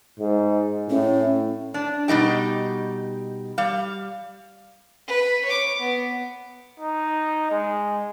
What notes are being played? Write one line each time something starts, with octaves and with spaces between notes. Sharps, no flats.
G#2
A2 C#4
D4
B2 G3 D#4 G4
G3 F5
B4
C#5 D6
B3
D#4
G#3